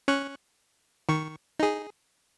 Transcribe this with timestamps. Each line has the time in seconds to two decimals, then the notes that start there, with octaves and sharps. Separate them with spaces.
0.08 C#4 C#6 F#6
1.09 D#3 C#6
1.59 D#4 G#4